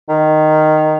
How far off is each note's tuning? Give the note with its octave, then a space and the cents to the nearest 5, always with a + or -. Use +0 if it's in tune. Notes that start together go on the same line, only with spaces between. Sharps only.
D#3 -10